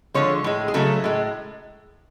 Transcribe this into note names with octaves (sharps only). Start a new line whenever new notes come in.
D3 F3 G#3 C#5
A2 G#3
G#4
C#3 F#3 A3 A4
A2 G#3